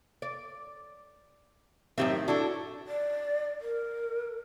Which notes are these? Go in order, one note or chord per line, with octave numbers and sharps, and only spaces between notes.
D5
F#2 A2 D#3 C4 G4 E5
D4 E4 F#4 A4
D5
A#4